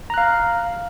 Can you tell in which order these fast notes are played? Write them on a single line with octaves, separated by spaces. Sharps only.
A#5 F#6 F5